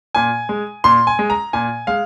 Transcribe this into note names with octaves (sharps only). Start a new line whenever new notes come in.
A#2 G#5
G#3
A#2 C6
G#5
G#3
A#5
A#2 G#5
G#3 F5